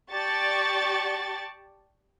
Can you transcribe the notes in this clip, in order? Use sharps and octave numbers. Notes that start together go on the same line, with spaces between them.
G4 D5 A5 C#6 A6